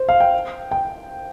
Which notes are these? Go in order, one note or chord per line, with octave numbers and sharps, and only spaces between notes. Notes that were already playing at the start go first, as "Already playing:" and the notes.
Already playing: C5
F5
G5
G5